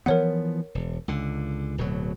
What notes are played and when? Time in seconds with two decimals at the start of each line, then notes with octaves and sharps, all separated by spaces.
0.06 E3 F3 B3 A#4 C#5 F#5
0.75 E1
1.08 C#2 D3
1.78 D1 B2 F#3